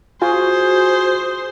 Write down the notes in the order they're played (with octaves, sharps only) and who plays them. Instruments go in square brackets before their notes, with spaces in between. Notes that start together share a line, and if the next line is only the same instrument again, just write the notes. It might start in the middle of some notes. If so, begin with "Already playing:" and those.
[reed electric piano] F4 G#5 [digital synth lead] F#4 [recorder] G#4 [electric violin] C5